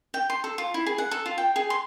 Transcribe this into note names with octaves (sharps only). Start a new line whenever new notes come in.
G5
C6
A4
F4
E4
G#4
F#5
A4
F4
G5
G#4
C6